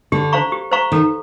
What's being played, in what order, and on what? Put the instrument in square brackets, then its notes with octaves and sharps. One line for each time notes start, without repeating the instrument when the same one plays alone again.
[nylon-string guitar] D3 [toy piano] G4
[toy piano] C5 F5 A#5 C#6
G4
C5 F5 A#5 C#6
[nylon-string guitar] D#3 [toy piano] A4